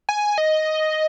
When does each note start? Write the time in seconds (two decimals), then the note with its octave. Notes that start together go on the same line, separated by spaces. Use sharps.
0.09 G#5
0.38 D#5